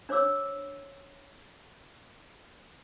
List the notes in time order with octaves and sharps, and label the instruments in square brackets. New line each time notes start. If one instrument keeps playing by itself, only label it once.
[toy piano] D4 C5 C#5 D6 E6